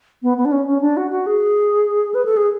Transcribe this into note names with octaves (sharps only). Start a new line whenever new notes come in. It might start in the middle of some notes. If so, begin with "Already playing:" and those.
B3
B3
D4
C#4
C#4
D4
F#4
F#4
G#4
B4
A4
G#4